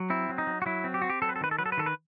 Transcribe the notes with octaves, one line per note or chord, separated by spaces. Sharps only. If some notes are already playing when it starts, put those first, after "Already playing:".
Already playing: F#3
C4 E4
F#3
D#4
F#3
F#4
F#3 E4
C4
G4
C4 F#4
G4
F#3 A4
B4
A4
D#3 B4
A4
F#3 B4
A4
B4
D#3 A4
B4